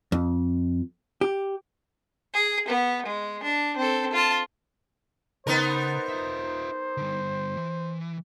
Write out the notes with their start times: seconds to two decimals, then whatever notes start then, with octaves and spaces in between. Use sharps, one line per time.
0.12 F2
1.21 G4
2.34 G#4
2.68 B3
3.06 G#3
3.43 D4
3.77 C4 A4
4.13 F4 A5
5.47 C#3 B3 D#4 A#4 C5
6.09 F4 E5
6.97 D3 G3
7.57 E3